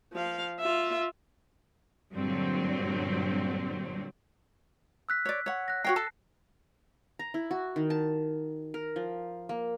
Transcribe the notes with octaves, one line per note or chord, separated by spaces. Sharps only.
F3 F5
F4 E5
G2 A#2 D3 F#3 C4
E6 F#6 B6
C#5 D5
C#5 F#5
F#6 A#6
F#4 C#5 G5 A#6 C7
A4 A5
A#5
E4
F#4
D#3
A5
A#4
F3
A#3